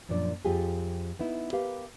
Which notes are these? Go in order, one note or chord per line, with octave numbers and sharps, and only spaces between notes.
F#2 A#2 F3 D4 D5
F2 F4 G4 G#4
B3 D#4 E4
G4 A#4 B4 F5